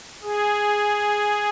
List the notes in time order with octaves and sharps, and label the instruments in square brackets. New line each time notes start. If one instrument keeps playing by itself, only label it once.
[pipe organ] G#4